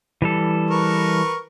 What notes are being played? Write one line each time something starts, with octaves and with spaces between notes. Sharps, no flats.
E3 G3 A4
A#4 B4 C#6